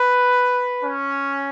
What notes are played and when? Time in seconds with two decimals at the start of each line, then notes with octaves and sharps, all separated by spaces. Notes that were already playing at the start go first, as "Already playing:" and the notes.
Already playing: B4
0.83 C#4